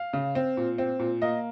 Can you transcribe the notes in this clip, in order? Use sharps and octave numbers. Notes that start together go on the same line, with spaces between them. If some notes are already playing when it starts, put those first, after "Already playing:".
Already playing: F5
C#3
C4
A#2
C4
A#2
A#3 D#5